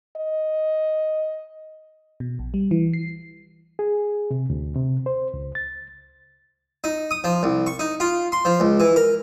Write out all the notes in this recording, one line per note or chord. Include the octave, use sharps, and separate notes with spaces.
D#5
B2
A#1
G3
E3
C7
G#4
C3
D2
C3
C5
C#2
A6
D#4
D#6
F3
C2
C#6
D#4
F4
C6
F3
C#2
E3
A#4